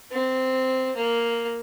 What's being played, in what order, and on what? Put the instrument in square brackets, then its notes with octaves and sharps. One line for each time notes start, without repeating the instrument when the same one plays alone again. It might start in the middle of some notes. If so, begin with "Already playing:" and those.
[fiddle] C4
A#3